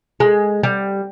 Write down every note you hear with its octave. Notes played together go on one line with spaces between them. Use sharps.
G#3
G3